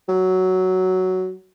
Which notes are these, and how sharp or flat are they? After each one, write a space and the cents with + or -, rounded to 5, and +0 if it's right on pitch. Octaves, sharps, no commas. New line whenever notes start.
F#3 +5